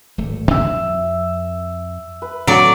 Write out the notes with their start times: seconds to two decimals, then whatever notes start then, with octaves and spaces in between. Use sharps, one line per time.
0.18 D1 G#1 A3
0.51 F2 E5
2.22 B4
2.47 A2 F#3 C4 D5